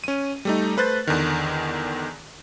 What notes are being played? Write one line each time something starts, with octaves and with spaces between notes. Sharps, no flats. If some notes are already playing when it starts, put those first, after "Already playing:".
C#4 D#7
G3 A3 D#4
A3 B4 C5 F#6 A6
E2 D3 D#3